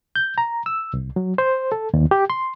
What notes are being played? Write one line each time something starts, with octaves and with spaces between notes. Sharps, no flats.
G6
A#5
E6
C2
F#3
C5
A4
D#2
G4
C6